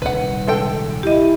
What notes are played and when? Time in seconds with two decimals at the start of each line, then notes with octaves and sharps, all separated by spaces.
0.02 D#1 C2 D#3 B4 F#5
0.47 G#3 A4 G5
1.03 E4 G4 D#5